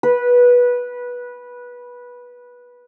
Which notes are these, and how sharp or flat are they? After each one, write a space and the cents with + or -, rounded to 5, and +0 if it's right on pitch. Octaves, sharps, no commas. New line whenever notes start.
B4 -15